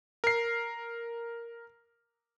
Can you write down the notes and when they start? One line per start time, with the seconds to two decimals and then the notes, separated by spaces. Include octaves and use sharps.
0.24 A#4 C7